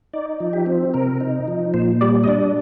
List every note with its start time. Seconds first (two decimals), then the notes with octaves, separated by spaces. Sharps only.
0.13 D#4 D5
0.40 F3
0.53 G4
0.66 C4
0.94 C3 A#4
1.20 D#4
1.48 F3
1.74 A#2 C5
2.01 G3 D5
2.24 D#5
2.28 D4 D5